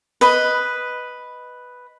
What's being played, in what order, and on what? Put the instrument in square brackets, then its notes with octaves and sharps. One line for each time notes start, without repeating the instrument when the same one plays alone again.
[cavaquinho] B4 D#5 B5